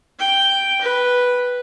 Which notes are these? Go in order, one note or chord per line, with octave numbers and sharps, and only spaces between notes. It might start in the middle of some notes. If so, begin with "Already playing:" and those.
G5
B4